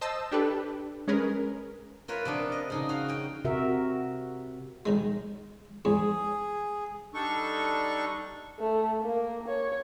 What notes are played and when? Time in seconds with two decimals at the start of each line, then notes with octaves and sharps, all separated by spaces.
0.01 C5 D#5 A5 E6
0.31 D4 G4 A4 B4
1.08 G#3 C#4 G#4 A#4 B4
2.08 F4 A#4 B4 C#5 E5
2.25 C3 B3 D4
2.52 D#5
2.70 C#3 D#4 G#4
2.89 F#4 F5
3.08 C#4 G5
3.44 C3 F#4 A#4 E5
4.86 B1 D#3 G#3
5.85 E2 G#2 G#4
7.14 G3 D4 D#4 A4 C#6
8.60 A3
9.02 A#3
9.48 C#5